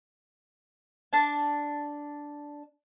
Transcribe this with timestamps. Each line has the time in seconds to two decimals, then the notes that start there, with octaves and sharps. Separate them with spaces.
1.13 D4 A5